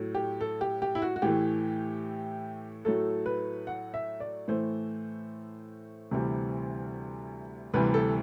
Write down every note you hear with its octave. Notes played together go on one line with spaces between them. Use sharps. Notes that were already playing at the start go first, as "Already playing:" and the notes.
Already playing: A2 F#3 A3
G4
A4
G4
G4
E4
F#4
F#4
A2 E3 A3 G4
A2 F#3 A3 A4
B4
F#5
E5
D5
A2 E3 A3 C5
D2 C3 E3 G3
D2 C3 E3 G3 B4
A4